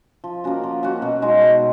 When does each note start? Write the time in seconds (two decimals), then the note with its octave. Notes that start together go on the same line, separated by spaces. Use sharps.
0.24 F3
0.44 A#3 C#4 F#4
0.64 F3
0.83 A#3 C#4 F#4
1.02 B2
1.22 G#3 D#4 F#4
1.42 B2